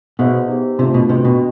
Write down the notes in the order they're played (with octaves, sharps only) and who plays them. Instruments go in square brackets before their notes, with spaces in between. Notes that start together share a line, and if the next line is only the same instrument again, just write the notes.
[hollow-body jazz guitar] B2 [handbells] B3 D#4 G#4 C5 E5
[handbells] D#4 G4 C5
[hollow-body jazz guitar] C3 [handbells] A3 D4 F4
[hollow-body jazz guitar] B2
[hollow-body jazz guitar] C3 [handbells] D4 F#4 B4 D#5 G5
[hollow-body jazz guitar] B2